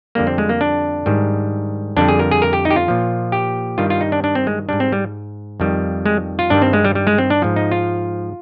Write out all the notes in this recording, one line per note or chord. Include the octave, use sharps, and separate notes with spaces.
F2 D3 G3 A#3
C4
G#3
A#3
D4
G#2 D#3 G3
F2 D3 G3 D4
G#4
A#4
G#4
A#4
G4
D#4
G4
F4
A#2 F3
G4
G2 D#3 G3 F4
F4
D#4
D4
D4
C4
G#3
G#2 G3 D4
C4
G3
F2 D#3 G3
G#3
F4
G2 D#3 G3 D4
C4
G#3
G3
G3
G#3
C4
D4
G#2 F3
D#4
F4